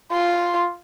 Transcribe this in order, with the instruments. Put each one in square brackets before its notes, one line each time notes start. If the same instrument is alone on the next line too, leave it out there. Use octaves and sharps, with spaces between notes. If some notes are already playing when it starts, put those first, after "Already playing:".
[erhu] F4 [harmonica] C6